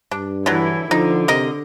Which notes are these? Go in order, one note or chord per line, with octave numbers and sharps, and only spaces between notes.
G2 D4
D3 E3 F#3 E4
D3 F3 D#4
C3 A#4 D#5